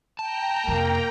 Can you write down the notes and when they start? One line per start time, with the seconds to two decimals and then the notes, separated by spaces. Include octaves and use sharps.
0.19 G5 A5 A#5
0.68 F2 C3 A#3